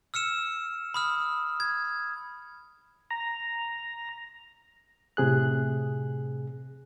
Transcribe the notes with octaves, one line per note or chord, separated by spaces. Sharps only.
E6 F6 C#7 E7
B5 D#6 F6
G#6
A#5
A2 C3 G#4 F#6